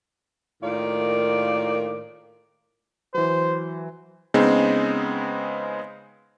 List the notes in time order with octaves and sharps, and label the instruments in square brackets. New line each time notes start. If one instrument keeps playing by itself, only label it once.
[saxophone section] A2 D#3 A#3 F4 D5
[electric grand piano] E3 F#3 [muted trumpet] C5
[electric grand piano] C#3 G#3 B3 C4 D#4